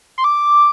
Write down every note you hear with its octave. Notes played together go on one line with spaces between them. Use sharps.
C6
D6